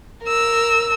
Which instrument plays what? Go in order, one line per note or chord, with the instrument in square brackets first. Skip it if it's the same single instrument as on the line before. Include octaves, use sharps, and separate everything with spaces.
[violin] A#4 E6